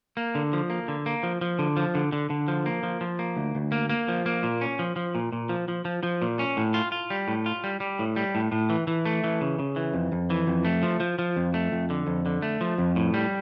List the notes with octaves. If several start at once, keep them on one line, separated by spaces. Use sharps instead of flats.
A#3
D3
F3
A#3
D3
A#3
F3
F3
D3
F3
D3
D3
D3
F3
A#3
F3
F3
A#3
D2
D2
A#3
A#3
F3
A#3
A#2
C#4
F3
F3
A#2
A#2
F3
F3
F3
F3
A#2
C#4
A2
F4
F4
G3
A2
F4
G3
G3
A2
G3
A2
A2
E3
E3
A3
E3
C#3
C#3
E3
F2
F2
E3
F2
A3
F3
F3
F3
F2
A3
F2
D3
F2
D3
A3
F3
F2
A2
G3